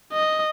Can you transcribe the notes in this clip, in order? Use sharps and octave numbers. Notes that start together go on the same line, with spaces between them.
D#5